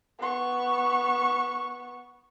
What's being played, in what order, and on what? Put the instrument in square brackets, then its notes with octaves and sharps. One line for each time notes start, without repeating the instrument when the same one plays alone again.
[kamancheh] B3 C#6